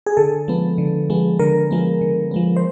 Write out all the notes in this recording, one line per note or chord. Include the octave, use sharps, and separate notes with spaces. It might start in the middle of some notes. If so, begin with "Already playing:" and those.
G#4
D3 A4
F3 G#3 B3
D3
F3 G#3 B3
D3 A#4
F3 G#3 B3
D3
F3 G#3 B3
C5